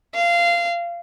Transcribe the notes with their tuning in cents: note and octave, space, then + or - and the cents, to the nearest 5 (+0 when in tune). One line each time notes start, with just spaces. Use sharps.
F5 -20